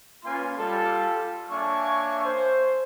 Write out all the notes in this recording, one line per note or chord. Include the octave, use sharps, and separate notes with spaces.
A#3 C#4 F4 B4 G#5 C6
G3 F4 A4
A#3 D4 C#5 E5 G#5 C#6
C5